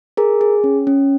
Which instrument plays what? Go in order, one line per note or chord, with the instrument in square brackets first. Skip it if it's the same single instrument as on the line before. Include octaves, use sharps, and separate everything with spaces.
[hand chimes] G#4 A#4
G#4
C#4
C#4